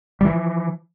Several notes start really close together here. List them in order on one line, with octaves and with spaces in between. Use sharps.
G3 E3 F3